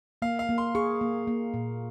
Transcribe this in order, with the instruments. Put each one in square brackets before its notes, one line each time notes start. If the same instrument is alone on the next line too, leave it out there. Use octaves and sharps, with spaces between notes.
[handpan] A#3 [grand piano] F5
[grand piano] F5
[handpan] A#3
[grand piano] C6
[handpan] G#4 [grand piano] C#6
[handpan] A#3
A#3
A#2